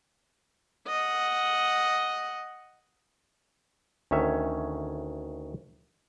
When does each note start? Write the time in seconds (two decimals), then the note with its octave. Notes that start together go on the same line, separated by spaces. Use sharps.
0.87 D#5 F#5
4.11 D2 D#3 C#4 C#5 E5